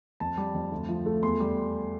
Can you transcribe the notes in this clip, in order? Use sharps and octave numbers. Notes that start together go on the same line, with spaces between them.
F2 A5
G3
F2
D2
F3
A3
E2 C6
G3